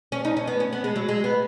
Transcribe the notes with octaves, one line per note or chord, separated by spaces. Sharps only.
C#4
D#4
C#4
B3
C#4
B3
G#3
F#3
G#3
B3